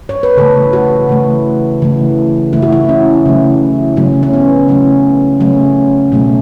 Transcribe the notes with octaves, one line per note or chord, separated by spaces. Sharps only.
C#5
B4
C#3 E3 A3 A4
F#4
C#3 E3 A3
C#3 E3 A3
C#3 E3 A3 E4
F#4
E4
C#4
C#3 F#3 A3
C#3 F#3 A3 C#4
C#4
B3
C#3 F#3 A3 C#4
C#3 F#3 A3 C#4
B2 F#3 A3